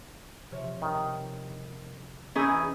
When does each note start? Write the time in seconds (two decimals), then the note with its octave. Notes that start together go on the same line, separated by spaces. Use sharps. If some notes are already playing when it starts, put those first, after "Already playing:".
0.51 C3 F3 C#5
0.82 D#3
2.35 E3 A3 C#4 D#4 E4 G#4 B4